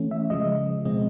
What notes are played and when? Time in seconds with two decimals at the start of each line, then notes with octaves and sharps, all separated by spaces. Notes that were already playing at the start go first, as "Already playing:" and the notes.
Already playing: E3 A3 C#4
0.11 E5
0.30 C#3 F3 G#3 D#5
0.85 B2 G#3 C4 D#5